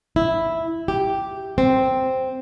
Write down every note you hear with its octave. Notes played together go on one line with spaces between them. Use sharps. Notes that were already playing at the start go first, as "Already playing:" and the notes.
E4
G4
C4